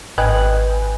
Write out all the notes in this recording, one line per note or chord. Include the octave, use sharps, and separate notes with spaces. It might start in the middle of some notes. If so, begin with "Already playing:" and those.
G#1 B4 D#5 G5 G#5 F#6